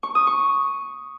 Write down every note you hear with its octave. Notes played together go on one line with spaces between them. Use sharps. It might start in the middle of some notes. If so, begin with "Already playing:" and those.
C#6
D#6
C#6